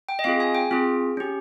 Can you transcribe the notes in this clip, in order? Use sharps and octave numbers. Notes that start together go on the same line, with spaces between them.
G5
D#5
C4 F4 G#4 F5
G#5
G5
C4 F4 G#4
C#4 G4